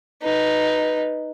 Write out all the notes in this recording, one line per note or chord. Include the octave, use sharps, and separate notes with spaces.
D#4 B4